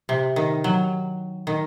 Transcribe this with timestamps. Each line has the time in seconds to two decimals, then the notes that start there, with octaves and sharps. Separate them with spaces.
0.09 C3
0.36 D#3
0.64 F#3
1.47 D#3